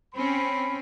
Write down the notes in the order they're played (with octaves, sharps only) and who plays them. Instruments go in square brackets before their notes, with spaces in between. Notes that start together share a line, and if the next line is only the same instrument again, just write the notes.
[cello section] C4 C#4 [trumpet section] B5